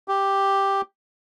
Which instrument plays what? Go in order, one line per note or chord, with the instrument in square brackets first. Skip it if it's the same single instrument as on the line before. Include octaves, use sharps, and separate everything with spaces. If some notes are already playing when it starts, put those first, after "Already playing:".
[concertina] G4